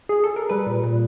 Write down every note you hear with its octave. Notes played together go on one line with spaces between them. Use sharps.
G#4
A4
A#4
G3 B4
A#2
A#2